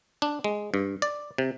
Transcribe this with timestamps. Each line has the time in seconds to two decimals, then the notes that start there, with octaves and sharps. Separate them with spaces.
0.22 D4
0.44 G#3
0.74 G2
1.02 D5
1.38 C3